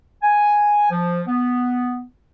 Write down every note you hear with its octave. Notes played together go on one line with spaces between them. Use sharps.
G#5
F3
B3